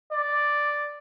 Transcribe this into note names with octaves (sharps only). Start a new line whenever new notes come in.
D5